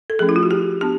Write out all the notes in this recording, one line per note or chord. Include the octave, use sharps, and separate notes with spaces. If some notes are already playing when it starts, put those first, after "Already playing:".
A4
F3 A3 C#4 G#4
E4
F4
F#4
G4
B3 D4 G4